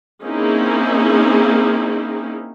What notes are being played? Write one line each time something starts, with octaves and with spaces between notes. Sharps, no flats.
A#3 C4 C#4 D#4 E4 G#4